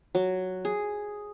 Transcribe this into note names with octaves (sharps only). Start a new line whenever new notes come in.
F#3
G#4